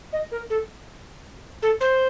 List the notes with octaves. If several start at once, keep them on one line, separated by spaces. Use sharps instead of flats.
D#5
A#4
A4
A4
C5